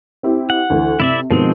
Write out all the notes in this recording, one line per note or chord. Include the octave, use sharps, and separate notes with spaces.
C4 E4 G4
F#5
D2 E3
C3 E4 D5 E5
B2 D#3 F3 G#3 C4